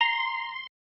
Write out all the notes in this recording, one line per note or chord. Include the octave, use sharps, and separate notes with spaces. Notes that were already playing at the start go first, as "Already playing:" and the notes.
A#5 C6